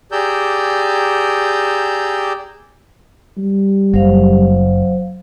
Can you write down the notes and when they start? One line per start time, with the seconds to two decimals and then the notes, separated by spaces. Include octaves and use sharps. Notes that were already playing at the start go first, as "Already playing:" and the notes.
0.12 G4 G#4 D5 A#5 E6 G6
3.38 G3
3.94 F#1 F#3 C5 F5